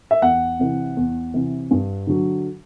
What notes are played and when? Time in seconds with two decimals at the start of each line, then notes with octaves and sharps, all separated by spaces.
0.11 E5
0.22 E2 F#5
0.59 C3 E3
0.96 E2
1.34 C3 E3
1.71 G2
2.07 D3 F#3